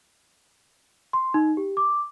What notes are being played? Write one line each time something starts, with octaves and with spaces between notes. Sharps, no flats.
C6
D#4
G4
D6